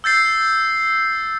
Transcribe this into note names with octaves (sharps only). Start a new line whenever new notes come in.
E6 G6 A6 C7